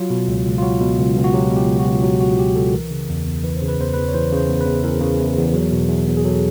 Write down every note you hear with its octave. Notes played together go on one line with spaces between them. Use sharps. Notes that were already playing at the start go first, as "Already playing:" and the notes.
Already playing: F#3 F4
B2
C#2
C#2
F4
F#3 F#4
B2
C#2
C#2
F#4
F#3 G4
B2
G4
C#2
F#4
C#2
F#3 F#4
B2 F#4
C#2 G4
C#2 A4
E3 A#4
C#3
E2
E2
E3 B4
C#3 C5
B4
E2 C5
E2 B4
C#5
E3 C5
C#3 C5
E2
B4
E2
E3 A#4
C#3
E2
E2
F#3
B2
E2
E2
G#4
F#3 A4